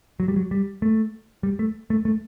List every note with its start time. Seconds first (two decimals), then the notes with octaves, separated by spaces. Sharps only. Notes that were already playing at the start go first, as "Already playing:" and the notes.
0.20 F#3
0.28 G3
0.36 F#3
0.51 G3
0.82 A3
1.43 G3
1.59 A3
1.90 A3
2.05 A3